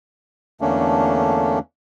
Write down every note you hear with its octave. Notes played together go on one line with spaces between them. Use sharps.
E2 D3 A3 A#3 C#4 D4